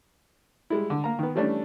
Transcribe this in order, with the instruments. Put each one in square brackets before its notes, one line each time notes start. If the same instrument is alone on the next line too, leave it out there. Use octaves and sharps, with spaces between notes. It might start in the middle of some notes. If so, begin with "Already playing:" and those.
[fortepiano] G3 G#3 E4
D3
A#3 A#5
D#3 B3
E3 G3 A3 C#4 D4